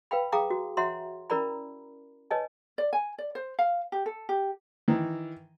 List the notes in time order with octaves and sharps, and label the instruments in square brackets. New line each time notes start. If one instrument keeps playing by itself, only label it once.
[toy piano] B4 F5 G5 B5
G#4 F5 G5 A#5 D6 D#6
F#4
F#4 C#5 E5 F#5 A#5 C6
C#4 E4 A#4 D5 A#5 B5
B4 C#5 D#5 G#5 A5
[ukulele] D5
G#5
D5
C5
F5
G4
A4
G4
[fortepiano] D#3 E3